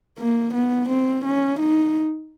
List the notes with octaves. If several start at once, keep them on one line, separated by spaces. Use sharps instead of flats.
A#3
B3
C4
C#4
D#4